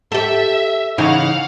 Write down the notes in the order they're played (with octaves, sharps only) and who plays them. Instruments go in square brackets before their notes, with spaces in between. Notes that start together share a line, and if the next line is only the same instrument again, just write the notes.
[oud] G4 A4 [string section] E5
[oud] C#3 E3 D#4 [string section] F5 F#5